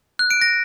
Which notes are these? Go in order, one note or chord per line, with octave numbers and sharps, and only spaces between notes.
F#6
D7
A#6